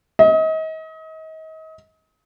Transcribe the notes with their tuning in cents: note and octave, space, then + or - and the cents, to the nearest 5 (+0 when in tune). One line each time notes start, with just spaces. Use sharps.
D#5 +35